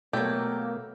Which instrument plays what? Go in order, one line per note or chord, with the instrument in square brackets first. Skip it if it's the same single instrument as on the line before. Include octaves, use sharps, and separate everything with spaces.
[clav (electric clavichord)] B2 A3 [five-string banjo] F#3 G4 [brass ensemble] A#3